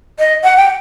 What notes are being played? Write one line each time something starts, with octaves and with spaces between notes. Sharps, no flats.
D#5
F#5
G5